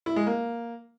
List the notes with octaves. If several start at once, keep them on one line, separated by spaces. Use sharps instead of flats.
E4
G#3
A#3